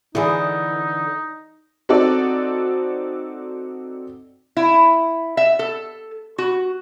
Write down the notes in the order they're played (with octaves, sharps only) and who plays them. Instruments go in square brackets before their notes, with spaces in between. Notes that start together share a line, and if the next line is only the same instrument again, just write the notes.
[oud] D3 E3 [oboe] D#4 [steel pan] E4 G#4
[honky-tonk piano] C4 D#4 F#4 A4 D5
[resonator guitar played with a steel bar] E4
E5
A4
F#4